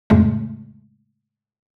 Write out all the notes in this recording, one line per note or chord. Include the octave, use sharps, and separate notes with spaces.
F2 A2 C#3 G#3 A3